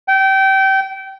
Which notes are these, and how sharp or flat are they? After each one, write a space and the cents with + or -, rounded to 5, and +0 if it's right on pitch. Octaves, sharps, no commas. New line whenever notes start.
G5 -25